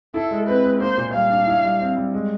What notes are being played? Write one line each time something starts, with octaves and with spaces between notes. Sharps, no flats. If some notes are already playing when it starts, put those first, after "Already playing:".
E4 A4
G#3
C4 B4
G#3
A#3 C5
A#2
G3 F5
D4
E4
G3
C4
G3
G#3